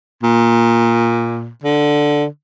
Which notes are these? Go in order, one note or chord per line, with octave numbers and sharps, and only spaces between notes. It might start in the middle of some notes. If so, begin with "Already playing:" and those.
A#2
D3